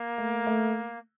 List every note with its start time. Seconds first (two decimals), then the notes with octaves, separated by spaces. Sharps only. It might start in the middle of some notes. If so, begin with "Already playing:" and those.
Already playing: A#3
0.18 A3
0.47 A3